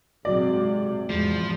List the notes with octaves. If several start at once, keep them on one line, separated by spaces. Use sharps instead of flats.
G#2 C3 F#3 F#4 D5 D#5
E2 G#2 F3 G#3